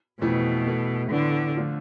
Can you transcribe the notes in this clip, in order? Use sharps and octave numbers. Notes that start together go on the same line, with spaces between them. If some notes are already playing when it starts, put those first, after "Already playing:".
F2 B2 E3 A3 E4
E3 A3 E4 A4
A2 D3 E3 B3 D4
D3 F3 A3 D4 F4